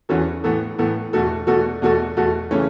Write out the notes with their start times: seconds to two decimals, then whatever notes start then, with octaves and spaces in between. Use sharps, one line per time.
0.09 E2 E3 C#4 F#4 A4
0.44 A2 E3 B3 A4
0.78 A2 E3 B3 A4
1.13 E2 B2 A3 F#4 A4
1.47 E2 B2 A3 F#4 A4
1.82 E2 B2 A3 F#4 A4
2.17 E2 B2 A3 F#4 A4
2.51 C#3 E3 A3 C#4